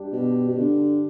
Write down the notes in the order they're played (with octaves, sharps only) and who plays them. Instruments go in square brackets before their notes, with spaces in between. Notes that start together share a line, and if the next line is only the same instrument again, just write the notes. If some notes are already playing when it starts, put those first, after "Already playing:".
Already playing: [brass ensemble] G2 G3 D4 G4
[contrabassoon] B2
B2
D3